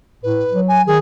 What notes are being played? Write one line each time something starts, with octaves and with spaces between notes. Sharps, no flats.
A2 B4
F#3
G#5
D#3 G#4